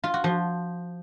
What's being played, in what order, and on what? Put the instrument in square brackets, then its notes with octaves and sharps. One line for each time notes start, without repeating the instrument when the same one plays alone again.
[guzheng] F4
F#4
F3